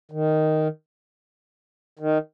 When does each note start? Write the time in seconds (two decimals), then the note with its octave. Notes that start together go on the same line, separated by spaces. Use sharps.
0.11 D#3
1.99 D#3